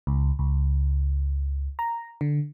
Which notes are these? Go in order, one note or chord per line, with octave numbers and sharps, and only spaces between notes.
C#2
C#2
A#5
D3